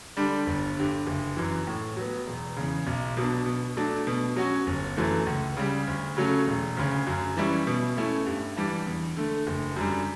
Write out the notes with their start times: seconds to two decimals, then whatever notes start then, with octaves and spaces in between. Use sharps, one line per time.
0.17 D3 G3 D4
0.47 G1
0.77 G2 D3
1.07 F#1
1.37 F#2 E3
1.67 A2
1.97 F#3 B3
2.26 E1
2.56 E2 C#3
2.87 B1
3.17 B2 F#3 B3 D4
3.46 B2
3.77 F#3 A3 D4
4.07 B2
4.36 F#3 C#4 F#4
4.67 G1
4.97 F#2 E3 A3
5.27 C#2
5.57 C#3 G3
5.87 D2
6.17 C#3 F#3 A3 C#4
6.47 E1
6.77 D2 C#3
7.07 F#2
7.37 E3 G3 C#4 E4
7.67 B2
7.96 A3 C#4 E4
8.26 G2
8.57 E3 G3 D4
8.87 E2
9.17 D3 A3
9.47 F#1
9.76 F#2 D3 G3